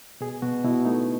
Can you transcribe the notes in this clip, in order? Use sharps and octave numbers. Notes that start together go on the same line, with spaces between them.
B2 G#4
B2 F#4
B2 E4
A3 D#4